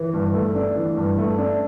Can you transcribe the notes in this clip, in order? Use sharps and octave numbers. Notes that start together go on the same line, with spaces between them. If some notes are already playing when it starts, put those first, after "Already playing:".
Already playing: E3
G2
A3
D4
E3
G2
A3
D4